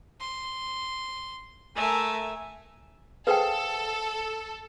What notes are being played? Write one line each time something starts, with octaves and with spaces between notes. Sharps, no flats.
C6
A3 A#4 E5 G#5
G#4 A4 B4 C5 F5 G5